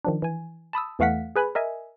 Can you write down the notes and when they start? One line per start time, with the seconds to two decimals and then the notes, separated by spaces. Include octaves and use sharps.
0.05 D#3 F3 D4
0.22 E3 G#5
0.73 A5 B5 D#6 E6
0.99 E2 E3 A3 F5 F#5 B6
1.36 G#4 B4 G#5 B5
1.55 A#4 D#5 E5 G#5